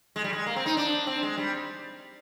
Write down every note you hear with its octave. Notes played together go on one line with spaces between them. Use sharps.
G#3
G3
G#3
A#3
C4
D#4
D4
C4
G#3
G3